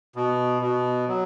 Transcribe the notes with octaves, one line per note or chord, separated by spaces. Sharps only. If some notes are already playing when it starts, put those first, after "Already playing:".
B2
B2
F#3